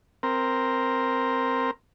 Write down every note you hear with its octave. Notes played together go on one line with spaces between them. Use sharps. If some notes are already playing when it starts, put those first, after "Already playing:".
C4 A#4